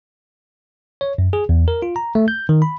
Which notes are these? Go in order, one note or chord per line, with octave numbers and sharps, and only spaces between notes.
C#5
F#2
G#4
E2
A#4
F4
A#5
A3
G6
D#3
B5